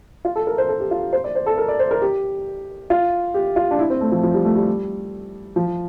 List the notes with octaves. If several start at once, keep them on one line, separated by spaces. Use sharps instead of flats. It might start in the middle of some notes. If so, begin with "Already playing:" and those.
F4
A4
A#4
C5
A4
G4
F4
C5
D5
C5
A4
A#4
D5
C5
A#4
G4
F4
G4
F4
D4
E4
C4
A3
F3
F3
G3
A3
G3
F3